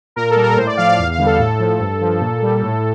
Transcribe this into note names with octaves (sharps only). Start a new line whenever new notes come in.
A#2 A#4
A4
G3
A#4
A2 C5
D5
F3 F5
F5
E2 F5
F5
D3 G3
A4
A2 A4
F3
G2
F3
A#2
G3
A2